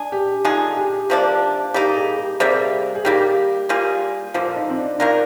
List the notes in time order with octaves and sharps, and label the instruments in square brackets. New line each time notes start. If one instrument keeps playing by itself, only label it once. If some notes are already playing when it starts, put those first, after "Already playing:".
Already playing: [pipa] G#3 D4 G#4
[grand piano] G4
[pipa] D3 G#3 D#4 G#4 [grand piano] F4
[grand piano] G4
[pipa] C3 F3 A#3 D4
[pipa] G3 A#3 D#4 [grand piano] G4
[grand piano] G#4
G4
[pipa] C3 G3 A#3 [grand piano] G#4
[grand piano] G#4
[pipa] D#3 G3 A#3 [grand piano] G4
[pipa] G3 A#3 F4 G#4
[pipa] D3 F3 A#3 [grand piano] F4
[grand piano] D#4
C4
D4
[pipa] D#3 A#3 F4 A#4 [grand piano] D4